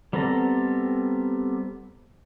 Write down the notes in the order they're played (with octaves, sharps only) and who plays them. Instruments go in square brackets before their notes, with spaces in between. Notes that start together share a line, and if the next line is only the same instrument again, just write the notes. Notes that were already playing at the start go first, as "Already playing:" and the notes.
[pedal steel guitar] G3 B3 C4 A4 A#5